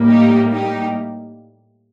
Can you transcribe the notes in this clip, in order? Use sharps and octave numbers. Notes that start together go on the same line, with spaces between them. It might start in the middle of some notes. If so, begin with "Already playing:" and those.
Already playing: A2 G3 A#3
D#4 G4
D#4 G4